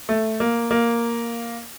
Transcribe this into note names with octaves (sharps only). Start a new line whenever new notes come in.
A3
A#3
A#3